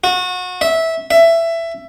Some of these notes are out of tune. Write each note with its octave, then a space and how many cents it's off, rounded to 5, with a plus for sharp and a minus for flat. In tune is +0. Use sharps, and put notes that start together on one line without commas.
F#4 -30
E5 -15
E5 +15